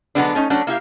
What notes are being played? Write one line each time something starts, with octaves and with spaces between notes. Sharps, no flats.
D3 F#3 G#3 B3 C4 D4
A3 C#4 D#4
F#3 A3 C#4 D4
A#3 E4 G4 F5